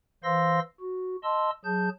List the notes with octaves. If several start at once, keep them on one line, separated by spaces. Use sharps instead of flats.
E3 C5 F5 C6 E6 A#6
F#4
D#5 A5 C6 E6
F#3 G#4 A5 G6